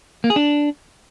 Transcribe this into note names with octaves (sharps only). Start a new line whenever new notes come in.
A#3
G#4
D4